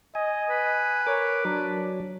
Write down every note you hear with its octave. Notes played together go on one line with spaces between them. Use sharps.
D#5 G#5
B4
A#4 C#5 D6
F#3 D4